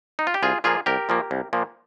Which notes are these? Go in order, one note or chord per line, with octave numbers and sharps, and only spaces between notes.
D#4
F4
G4
C2 F4 G#4
A#2 F3 A#3 F4 G#4
C2 G4 A#4
A#2 F3 A#3
C2
A#2 F3 A#3